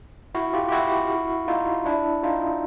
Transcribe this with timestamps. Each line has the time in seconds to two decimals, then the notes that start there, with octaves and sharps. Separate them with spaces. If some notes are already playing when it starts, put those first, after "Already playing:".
0.35 E4 F#4
0.54 F4 G4
0.68 G4
0.72 E4 F#4
1.48 D#4 F4
1.85 D4 E4
2.23 D#4 F4